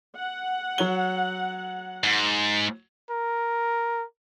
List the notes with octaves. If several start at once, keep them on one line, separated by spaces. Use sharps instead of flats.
F#5
F#3 C#5 G7
G#2
A#4